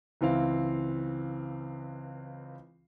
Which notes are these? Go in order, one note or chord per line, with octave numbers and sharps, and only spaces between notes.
C#2 E3 C4 F5